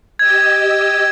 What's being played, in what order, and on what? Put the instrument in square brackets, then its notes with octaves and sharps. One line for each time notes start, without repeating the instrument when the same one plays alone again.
[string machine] G4 D#5 E6 [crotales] G#6